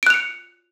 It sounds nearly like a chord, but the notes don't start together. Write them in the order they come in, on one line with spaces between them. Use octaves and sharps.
D7 F#6 F7 C#7